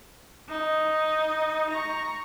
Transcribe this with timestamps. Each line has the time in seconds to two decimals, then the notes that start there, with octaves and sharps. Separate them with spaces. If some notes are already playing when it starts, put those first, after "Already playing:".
0.49 D#4
1.70 A#5 C#6